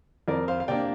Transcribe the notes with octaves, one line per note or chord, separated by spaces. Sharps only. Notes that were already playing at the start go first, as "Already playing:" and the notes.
F2 A#4 D5
C5 F5
F5
C3 A#3 D4 D5 G5